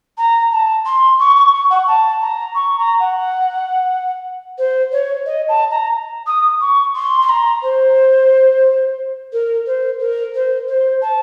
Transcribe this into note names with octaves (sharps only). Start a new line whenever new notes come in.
A#5
A5
C6
C#6
C#6
C#6
F#5
A5
A#5
C#6
A#5
F#5
C5
C#5
D#5
A5
A#5
D#6
C#6
C6
C6
A#5
C5
A#4
C5
A#4
C5
C5
A5